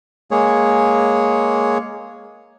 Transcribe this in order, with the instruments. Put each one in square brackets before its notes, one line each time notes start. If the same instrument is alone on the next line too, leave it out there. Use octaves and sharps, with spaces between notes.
[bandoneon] G#3 A#3 G#4 C#5